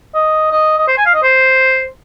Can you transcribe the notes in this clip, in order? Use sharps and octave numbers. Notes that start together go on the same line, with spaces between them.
D#5
D#5
D#5
C5
G#5
F5
D#5
C5